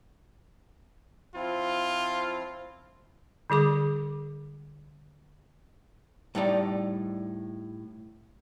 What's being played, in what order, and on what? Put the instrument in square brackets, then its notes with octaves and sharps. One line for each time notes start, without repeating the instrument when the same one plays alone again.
[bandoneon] F3 C4 E4 [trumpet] F4
[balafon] D3 G3 G#4 D6
[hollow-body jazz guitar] A2 G3 D#4 D5